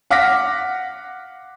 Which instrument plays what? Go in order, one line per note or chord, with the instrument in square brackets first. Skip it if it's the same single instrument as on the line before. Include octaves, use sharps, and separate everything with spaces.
[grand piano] F5 F#5 D6 F6 A#6 B6